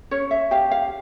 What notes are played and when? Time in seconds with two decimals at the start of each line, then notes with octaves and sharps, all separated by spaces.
0.11 C#4 C#5
0.31 E5
0.51 G4 F5
0.71 F5